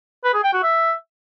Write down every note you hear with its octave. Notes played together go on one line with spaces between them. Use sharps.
B4
G#4
G5
F#4
E5